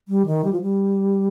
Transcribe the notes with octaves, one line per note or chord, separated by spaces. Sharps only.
G3
D#3
G3
F3
G3